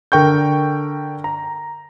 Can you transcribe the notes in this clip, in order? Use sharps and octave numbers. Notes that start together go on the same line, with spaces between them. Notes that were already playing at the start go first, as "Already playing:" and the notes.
D3 A#4 G5 C#6 G6
A#5